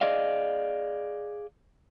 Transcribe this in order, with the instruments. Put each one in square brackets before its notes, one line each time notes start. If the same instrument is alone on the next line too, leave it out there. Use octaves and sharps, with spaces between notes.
[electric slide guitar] G#4 D5 D#5 F5